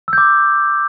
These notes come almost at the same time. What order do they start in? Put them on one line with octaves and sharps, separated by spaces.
E6 G6 D6